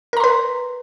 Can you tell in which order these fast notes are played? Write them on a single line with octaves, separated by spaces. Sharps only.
A#4 A#5 C6 B4